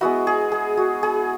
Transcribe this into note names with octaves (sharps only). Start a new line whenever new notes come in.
G#3 B3 E4 F#4
G#4
G#4
F#4
G#4